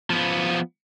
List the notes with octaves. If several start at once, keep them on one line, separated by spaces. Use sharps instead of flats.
F3 B3